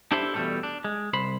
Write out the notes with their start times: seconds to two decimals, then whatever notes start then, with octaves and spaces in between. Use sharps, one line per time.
0.12 D4 E4 G4 A4 C5 E5
0.34 E2 B2 F3 G3 A3 A4
0.63 D4
0.84 G#3
1.13 C2 C5 B5